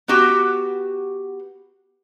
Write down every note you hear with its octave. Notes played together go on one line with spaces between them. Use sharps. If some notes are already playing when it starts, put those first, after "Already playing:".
B3 F#4 G4